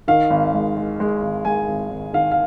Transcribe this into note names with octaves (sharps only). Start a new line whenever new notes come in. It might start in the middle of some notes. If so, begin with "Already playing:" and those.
D#3 F5
G#1
G#3
G#3
G#3
G#1
G#3 G#5
G#1
G#1
D#3 F5
F5